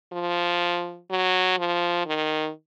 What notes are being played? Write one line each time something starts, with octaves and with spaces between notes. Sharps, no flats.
F3
F#3
F3
D#3